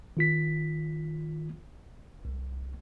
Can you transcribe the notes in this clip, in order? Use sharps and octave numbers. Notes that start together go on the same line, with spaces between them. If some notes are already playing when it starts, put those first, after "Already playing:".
D#3 F4 B6
C2